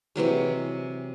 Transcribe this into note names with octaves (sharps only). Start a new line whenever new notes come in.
C3 E3 F#3 G#3